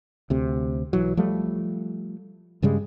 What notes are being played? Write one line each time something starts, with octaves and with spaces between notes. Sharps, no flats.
D2 C3
B1 E3 F#3
F3 G3 A3
G2 C#3 G3 G#3